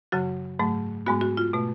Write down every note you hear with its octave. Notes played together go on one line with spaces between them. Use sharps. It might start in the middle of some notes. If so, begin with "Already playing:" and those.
F#2 C#3 F#3 F#4
G#2 F#3 A3
G#2 G#3 B3 F#4
F#4
F4
B2 A3